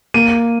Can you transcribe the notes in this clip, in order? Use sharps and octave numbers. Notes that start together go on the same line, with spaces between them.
A#3 D#7